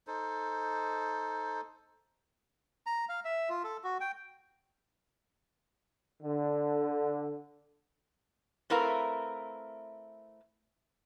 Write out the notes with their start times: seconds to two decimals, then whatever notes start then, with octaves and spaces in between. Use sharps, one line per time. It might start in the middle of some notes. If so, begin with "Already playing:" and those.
0.07 D#4 A4 C5
2.86 A#5
3.09 F5
3.25 E5
3.49 F4
3.64 A4
3.84 F#4
4.01 G5
6.23 D3
8.70 A3 C4 E4 A#4 B4 F5